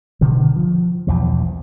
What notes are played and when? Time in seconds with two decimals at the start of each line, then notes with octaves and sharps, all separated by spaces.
0.21 B2 D3 D#3
0.56 F3
1.07 B1 E2 F3